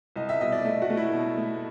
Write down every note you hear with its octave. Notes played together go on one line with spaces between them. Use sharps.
C2 D#5
E5
B2 D#5
D5
A3
F#4
A3
E4
B2
A3